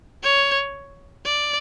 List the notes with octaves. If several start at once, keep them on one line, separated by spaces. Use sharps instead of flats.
C#5
D5